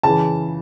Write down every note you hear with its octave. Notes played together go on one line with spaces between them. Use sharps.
C#3 E3 A5